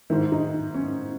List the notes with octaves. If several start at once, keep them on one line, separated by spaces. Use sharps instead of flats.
G#2 D#3 E4
D#4
C#4